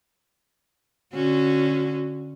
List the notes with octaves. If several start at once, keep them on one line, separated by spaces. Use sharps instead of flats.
D3 C#4 F#4